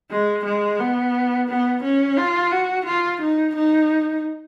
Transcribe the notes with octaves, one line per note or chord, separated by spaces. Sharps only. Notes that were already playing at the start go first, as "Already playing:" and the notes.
G#3
G#3
B3
B3
C#4
F4
F#4
F4
D#4
D#4